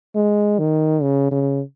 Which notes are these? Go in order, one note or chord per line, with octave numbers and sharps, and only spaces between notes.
G#3
D#3
C#3
C#3